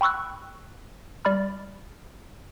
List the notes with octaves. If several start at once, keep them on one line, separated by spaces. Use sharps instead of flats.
G5 B5 C#6 E6 F#6
G3 D5 B5 F6